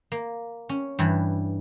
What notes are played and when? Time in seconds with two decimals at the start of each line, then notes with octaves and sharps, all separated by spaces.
0.12 A#3
0.69 C#4
0.99 G2 E3